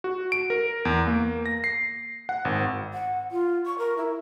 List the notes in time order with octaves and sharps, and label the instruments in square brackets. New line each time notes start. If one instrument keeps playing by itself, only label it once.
[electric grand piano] F#4
D7
A#4
E2
A#3
A#6
C7
F#5
G#1
[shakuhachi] F#5
F4
C#6
A#4
E4